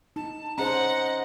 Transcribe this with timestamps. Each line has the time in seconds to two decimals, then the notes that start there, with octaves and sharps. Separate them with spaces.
0.16 D#4 A5
0.58 C#4 G#4 C5 D#5 F#5 A#5